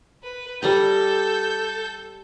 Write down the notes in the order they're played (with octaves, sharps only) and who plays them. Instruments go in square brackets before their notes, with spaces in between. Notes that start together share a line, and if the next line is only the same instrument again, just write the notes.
[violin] B4
[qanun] G3 D5 A#5 [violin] A4 G6